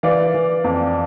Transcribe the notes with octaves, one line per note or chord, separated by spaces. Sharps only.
E3 D5 F5
E3
F2